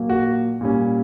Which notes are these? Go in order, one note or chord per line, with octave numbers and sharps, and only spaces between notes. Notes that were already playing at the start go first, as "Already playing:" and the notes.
Already playing: A#2 F#3 A#3
F#4
A#2 G3 C#4